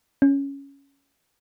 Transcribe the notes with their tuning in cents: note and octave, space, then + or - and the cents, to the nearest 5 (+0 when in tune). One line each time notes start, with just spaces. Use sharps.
C#4 +5